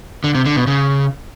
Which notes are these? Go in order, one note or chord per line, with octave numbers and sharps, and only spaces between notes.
D3
C3
D3
B2
C#3